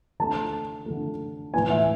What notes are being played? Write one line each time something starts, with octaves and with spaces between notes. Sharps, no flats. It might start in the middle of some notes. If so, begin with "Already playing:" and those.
D3 A3 A5
D3 A3
A2 E3 B3 G#5
E5